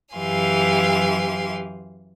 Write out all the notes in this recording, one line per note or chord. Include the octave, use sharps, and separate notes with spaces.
F#2 E3 G4 F5 G#5 C6